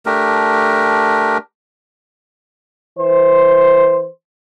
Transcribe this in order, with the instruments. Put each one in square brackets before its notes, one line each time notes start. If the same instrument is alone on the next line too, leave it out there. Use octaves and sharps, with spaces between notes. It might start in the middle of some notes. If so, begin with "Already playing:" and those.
[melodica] A3 D4 G4 A#4
[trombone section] E3 C5